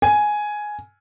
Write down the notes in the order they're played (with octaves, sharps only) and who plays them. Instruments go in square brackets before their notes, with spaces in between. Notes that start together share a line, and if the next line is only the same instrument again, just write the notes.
[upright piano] G#5